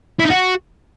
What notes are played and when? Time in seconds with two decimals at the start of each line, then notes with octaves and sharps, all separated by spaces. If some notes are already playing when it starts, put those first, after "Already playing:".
0.20 E4
0.25 D#4
0.30 F#4